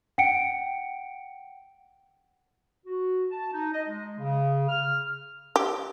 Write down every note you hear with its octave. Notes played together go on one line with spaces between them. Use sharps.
F#5 G5 C#7 D7
F#4
A5
D#4
D#5
G#3
C#3
F6
G4